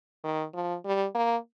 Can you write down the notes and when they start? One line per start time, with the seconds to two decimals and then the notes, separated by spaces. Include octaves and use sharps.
0.24 D#3
0.54 F3
0.85 G3
1.15 A#3